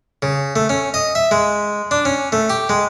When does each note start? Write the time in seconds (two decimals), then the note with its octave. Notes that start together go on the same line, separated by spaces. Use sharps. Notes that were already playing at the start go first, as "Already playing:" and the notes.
0.22 C#3
0.56 A3
0.69 C#4
0.94 D#5
1.15 E5
1.31 G#3
1.91 D4
2.05 C#4
2.32 A3
2.50 G4
2.69 G#3